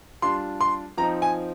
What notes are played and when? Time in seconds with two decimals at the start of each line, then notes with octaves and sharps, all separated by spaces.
0.22 G3 D4 F4 C6
0.61 C6
0.98 F3 C4 D#4 A#5
1.22 G#5